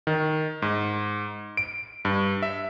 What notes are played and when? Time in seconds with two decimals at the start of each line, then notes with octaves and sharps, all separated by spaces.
0.07 D#3
0.62 G#2
1.57 D7
2.05 G2
2.42 E5